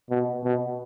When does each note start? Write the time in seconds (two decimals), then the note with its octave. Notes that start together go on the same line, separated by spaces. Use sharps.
0.10 B2
0.44 B2